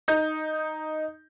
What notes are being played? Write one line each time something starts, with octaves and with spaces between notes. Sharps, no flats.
D#4 G6